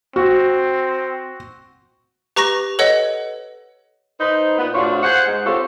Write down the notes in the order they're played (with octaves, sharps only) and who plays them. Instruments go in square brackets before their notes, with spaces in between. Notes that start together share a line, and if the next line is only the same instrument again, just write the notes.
[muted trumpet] C4 [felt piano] F#4
[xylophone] G4 B4 A#5 C#6 A#6
A4 B4 C#5 D#5 F#5
[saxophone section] D#4 B4 C5
A#2 B3
A2 C3 D4 F4 F#4 C#5
G#4 C5 F5 F#5
G#2
C4 F4 G4 A4 C5 C#5